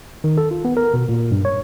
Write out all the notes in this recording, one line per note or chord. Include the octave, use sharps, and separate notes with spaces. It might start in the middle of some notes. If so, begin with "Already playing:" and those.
D#3
A4
F4
B3
A#4
B2
A#2
G2
C#5